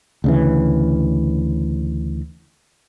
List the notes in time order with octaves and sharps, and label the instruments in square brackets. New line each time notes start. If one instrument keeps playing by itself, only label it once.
[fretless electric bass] D2 C#3 E3